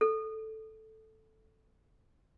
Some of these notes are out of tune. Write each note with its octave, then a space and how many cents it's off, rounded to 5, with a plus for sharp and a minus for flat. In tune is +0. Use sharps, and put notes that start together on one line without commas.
A4 +0